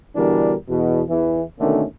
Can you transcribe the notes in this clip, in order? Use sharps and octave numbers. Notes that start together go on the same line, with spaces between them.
B2 D3 E3 G3 D4 A#4
E2 B2
E2 E3
B2 D3 D#3 A3 A#3 C#4